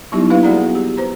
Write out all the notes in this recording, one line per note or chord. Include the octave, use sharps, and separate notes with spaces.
F#3 G3 B3 D#4 E4 G4
A#3 D4 E4 B4 F5
G3 F#4 G#4 D5 F#5 A#5
B3
G4
B4 C5 A#5